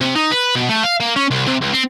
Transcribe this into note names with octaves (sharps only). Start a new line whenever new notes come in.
C3
D#4
B4
B2
A3
F5
A#3
C#4
C2
C3
C#2
C4